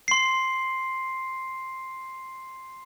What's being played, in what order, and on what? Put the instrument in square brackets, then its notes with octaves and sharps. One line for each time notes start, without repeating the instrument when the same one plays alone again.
[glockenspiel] C6 C7